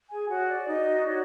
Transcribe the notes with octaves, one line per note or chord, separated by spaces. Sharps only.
G#4 G#5
F#4 C#5 F#5
C#5
D5
D#4 F#4 D#5
C#5 D5